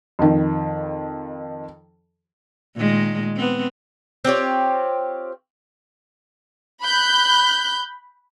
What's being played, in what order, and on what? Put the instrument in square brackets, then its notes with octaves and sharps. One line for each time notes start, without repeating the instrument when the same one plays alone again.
[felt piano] F2 D#3
[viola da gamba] A#2 D#3 G#3
B3 C4
[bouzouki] C4 F4 G4 C#5
[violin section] B5 F#6 G6